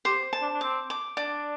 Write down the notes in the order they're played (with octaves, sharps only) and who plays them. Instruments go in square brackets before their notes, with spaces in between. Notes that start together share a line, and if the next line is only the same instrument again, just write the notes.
[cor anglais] G4 [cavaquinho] C5
[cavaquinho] A5
[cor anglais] D4
D4
[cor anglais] C4 [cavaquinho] D6
[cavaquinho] D6
[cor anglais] D4 [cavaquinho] D5